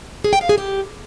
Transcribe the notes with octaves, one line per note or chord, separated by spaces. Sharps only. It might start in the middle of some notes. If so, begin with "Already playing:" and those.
G#4
G5
F5
G#4
G4